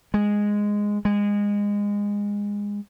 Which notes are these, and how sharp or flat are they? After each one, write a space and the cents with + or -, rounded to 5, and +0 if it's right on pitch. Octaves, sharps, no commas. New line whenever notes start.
G#3 -5
G#3 -20